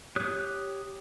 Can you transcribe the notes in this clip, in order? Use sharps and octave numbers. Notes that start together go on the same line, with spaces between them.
G4 C#5 D#6 F#6 G6